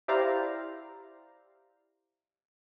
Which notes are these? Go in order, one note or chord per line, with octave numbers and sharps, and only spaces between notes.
E4 G4 C5 D5 F5 A#5